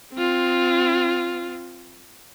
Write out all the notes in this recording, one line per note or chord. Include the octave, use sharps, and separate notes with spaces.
C4 F4